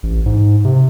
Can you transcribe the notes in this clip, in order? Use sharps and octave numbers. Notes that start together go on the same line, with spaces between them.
A1
G#2
C3